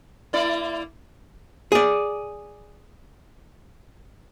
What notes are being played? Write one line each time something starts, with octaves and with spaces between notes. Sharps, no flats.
A#3 E4 D5
G#4 D5